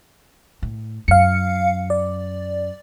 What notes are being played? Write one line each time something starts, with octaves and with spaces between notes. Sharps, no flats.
A2
F#2 F5 C#7
D5